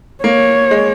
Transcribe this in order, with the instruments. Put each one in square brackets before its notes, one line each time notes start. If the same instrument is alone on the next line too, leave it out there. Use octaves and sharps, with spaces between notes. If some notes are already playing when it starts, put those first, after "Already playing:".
[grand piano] A#3 [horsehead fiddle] C#5
[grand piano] G#3